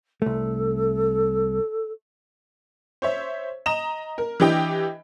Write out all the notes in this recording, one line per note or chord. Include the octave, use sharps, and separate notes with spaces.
C2 A3 A4
C5 C#5 E5
D#5 A#5 E7
A#4
E3 D4 G4 D#5 G5